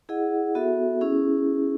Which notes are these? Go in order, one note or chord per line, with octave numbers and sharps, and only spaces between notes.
E4 G#4 D#5 F#5
B3 F#4 A4 E5
C#4 E4 G#4